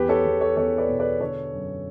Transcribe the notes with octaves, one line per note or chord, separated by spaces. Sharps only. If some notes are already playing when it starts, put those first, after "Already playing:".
Already playing: E2 G4 B4
A4 C#5
E2
A4 C#5
E2 A4 C#5
B4 D5
B2
B4 D5
D3 A4 C#5
F#2